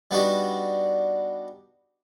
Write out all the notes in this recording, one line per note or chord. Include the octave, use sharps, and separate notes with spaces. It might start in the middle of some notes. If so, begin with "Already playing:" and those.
G3 B3 D4 D#4 F#4 G4